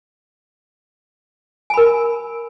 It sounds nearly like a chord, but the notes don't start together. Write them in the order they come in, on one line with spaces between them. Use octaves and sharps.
G#5 B5 A#4